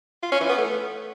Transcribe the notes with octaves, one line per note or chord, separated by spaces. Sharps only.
F4
C#4
E3
B3
A3